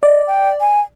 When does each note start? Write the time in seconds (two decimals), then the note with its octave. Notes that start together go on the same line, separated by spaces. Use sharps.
0.03 D5 D#5
0.27 G5
0.60 G#5